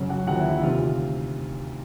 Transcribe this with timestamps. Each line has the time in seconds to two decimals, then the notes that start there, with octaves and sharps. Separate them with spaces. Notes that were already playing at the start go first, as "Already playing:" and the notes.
Already playing: F#2 C#3 F#3
0.09 F#4 F#5
0.27 D#2 D3 F3 F#4 F#5
0.39 E4 E5
0.50 E4 E5
0.63 D2 C3 D#3 F4 F5